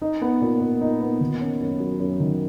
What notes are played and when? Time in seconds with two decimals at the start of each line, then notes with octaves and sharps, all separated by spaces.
0.02 D#4
0.22 B3
0.41 A#2
0.61 A#2
0.81 D#4
1.01 B3
1.21 D#3
1.41 C#4
1.61 F#2
1.80 F#3
2.00 F#2
2.20 D#3